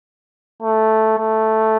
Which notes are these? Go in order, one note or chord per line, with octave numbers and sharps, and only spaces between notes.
A3
A3